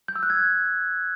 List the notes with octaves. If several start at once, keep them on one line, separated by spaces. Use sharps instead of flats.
G6
E6
F#6
G#6